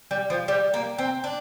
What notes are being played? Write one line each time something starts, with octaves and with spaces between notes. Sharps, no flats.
G3
F3
G3
A#3
C4
D4